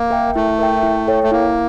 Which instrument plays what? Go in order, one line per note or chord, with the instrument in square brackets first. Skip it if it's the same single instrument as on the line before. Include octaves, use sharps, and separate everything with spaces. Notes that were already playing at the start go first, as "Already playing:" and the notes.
Already playing: [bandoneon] A#3
[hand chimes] A#4 E5 G5
[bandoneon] A3 [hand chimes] E4
[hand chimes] A#4 E5 G5
E4
A4 C#5 G5
[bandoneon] A3
[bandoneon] A#3 [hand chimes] E4